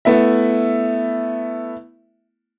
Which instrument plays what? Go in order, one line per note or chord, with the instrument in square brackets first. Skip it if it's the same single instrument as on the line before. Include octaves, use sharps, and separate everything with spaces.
[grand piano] A3 B3 E4 E5